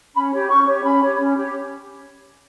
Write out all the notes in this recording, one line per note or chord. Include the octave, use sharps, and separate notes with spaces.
C#4 B5
G4 C#5
C#4 C#6
G4 C#5
C#4 B5
G4 C#5
C#4
G4 C#5